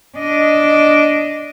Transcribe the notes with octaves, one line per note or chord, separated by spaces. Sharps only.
D4 D#5